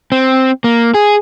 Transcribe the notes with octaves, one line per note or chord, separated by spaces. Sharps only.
C4
A#3
G#4